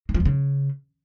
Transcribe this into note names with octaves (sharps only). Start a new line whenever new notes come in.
D#3
F3
E2
C#3